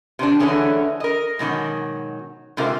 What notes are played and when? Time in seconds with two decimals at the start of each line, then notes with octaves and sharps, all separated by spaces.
0.19 C3 D#3 C4 D4
0.40 D3 E3 F#3 A3 C#4 G#4
1.00 A#4 D#5
1.39 G#2 B2 D#3 F#3
2.57 G#2 C3 F4 A#4 C5